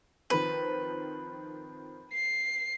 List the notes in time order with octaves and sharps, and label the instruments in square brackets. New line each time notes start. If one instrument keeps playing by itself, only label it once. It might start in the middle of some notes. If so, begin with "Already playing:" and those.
[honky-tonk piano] D#3 F3 C4 [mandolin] B4
[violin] C7